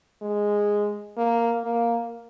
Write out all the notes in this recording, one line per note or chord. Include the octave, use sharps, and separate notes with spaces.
G#3
A#3
A#3